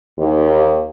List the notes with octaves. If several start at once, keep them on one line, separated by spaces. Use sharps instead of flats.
D#2